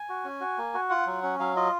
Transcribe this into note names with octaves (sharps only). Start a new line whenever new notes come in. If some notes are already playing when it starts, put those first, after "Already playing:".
Already playing: G#5
F#4
C#4
F#4
A#3
F#4
F4 F#5
F#3
C#4
F#3 F5
F4 D#5